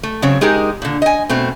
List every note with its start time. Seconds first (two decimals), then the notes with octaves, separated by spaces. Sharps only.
0.03 A3
0.22 C#3 F#3 C4 C#5
0.41 G#3 D#4 G4 G#4 A#4
0.82 A#2 D3
1.02 D#5 G#5
1.29 B2 A3 C4